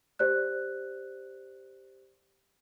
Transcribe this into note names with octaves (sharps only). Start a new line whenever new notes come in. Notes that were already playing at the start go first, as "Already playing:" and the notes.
G4 C5 D5 F#6